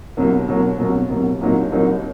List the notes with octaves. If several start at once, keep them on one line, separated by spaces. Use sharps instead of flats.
C2 B2 F#3 A#3
C2 B2 F#3 A#3
C2 B2 F#3 A#3
C2 B2 F#3 A#3
C2 A#2 F#3 A#3 D#4
C2 A#2 F#3 A#3 D#4